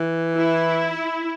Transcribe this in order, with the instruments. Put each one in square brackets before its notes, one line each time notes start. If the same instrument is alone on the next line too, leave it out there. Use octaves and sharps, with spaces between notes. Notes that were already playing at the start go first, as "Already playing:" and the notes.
Already playing: [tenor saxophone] E3
[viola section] E4